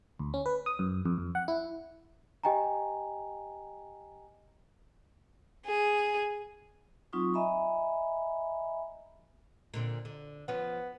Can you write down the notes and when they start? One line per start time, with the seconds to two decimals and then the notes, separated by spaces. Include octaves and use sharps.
0.19 D2
0.34 C#4
0.46 B4
0.66 D#6
0.79 F#2
1.05 F2
1.18 F2
1.35 F#5
1.48 E4
2.44 G4 D#5 G5 G#5 A#5
5.67 G#4
7.13 F#3 C4 D#4 F4 C#6 D#6
7.34 D#5 E5 G#5 A#5 B5
9.74 A#2 D3 C4
10.05 D3
10.48 F3 B3 C#4